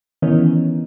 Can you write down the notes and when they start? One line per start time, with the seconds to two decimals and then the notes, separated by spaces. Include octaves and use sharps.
0.22 D#3 E3 B3 C#4 D#4